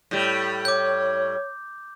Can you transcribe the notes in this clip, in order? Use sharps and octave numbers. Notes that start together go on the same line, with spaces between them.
A2 G3
C#5 D6 G6